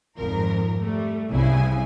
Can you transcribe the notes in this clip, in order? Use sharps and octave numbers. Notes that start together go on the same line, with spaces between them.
G#1 F2 A#4
G3 A3
C2 C#3 E4 G#5